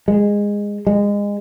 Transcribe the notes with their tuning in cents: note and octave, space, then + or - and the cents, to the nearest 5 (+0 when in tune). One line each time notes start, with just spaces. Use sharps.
G#3 -15
G#3 -25